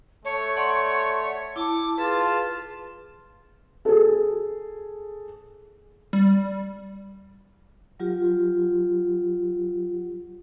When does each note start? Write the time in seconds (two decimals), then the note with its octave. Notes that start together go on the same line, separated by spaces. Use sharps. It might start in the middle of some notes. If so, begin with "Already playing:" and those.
0.25 A3 C#5 A5
0.57 D5 F#5 C6
1.56 E4 A5 D6
1.98 F4 G#4 B4 A5
3.85 G#4 A4
6.13 G3
8.00 F#3 F4 G4